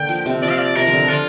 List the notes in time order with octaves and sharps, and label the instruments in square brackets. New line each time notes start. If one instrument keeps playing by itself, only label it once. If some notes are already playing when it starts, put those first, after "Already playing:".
Already playing: [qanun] D3 A#3 [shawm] G5
[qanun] F3
C3
[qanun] F3 [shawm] D5
[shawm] F5
D5
[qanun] C3 [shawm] A#4
[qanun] F3
D3
[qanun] D3 [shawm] F4